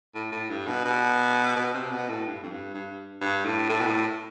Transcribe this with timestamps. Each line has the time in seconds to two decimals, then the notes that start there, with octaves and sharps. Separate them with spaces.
0.15 A2
0.32 A2
0.50 G2
0.67 B2
0.85 B2
1.56 B2
1.74 C3
1.92 B2
2.09 A2
2.27 G2
2.43 F2
2.50 G2
2.74 G2
3.21 G2
3.45 A2
3.69 A2
3.81 B2
3.86 A2